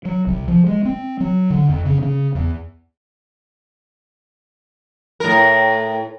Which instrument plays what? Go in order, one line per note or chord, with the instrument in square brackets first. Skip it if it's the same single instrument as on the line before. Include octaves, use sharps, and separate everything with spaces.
[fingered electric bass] F#3
C2
F3
G#3
C4
F#3
D3
F2
C#3
C#3
E2
[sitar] A2 A#4